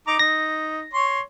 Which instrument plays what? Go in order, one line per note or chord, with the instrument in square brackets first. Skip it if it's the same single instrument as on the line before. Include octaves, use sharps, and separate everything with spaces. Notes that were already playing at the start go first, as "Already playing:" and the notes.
[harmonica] D#4 A#5 D6
[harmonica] D#4 [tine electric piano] A#6
[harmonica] C#5 C6